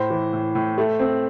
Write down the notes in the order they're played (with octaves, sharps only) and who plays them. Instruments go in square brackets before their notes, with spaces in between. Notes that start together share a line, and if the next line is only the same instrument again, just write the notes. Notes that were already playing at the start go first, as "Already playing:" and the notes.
Already playing: [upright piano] A2 C5
E3
A2
A2
A3
C4